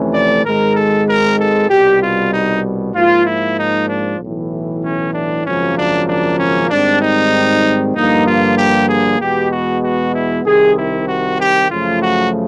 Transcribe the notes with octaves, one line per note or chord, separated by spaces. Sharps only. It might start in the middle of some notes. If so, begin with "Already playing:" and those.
Already playing: F2 C3 E3 A3 C#4
D5
G#1 G#2 D#3 G#3 A#4
A4
A#4
A4
C2 B2 G3 G4
F4
D#4
G#2 F3 A#3 F4
E4
D#4
D4
B1 A2 E3
C#4
D4
G#1 F#2 C#3 F3 A#3 C#4
D4
D4
C#4
G#2 D#3 G3 C4 D4
D#4
G2 D3 F3 A#3 D#4
F4
G4
G#4
E2 B2 G#3 B3 G4
F#4
F#4
E4
C2 C3 D#3 G#4
E4
F#4
G4
F#2 C#3 F3 A3 F4
F#4